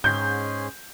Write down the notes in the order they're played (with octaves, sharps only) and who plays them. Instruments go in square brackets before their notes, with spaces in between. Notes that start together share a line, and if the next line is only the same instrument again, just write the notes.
[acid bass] G#2 [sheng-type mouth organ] C#4 G#4 C6 [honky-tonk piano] G6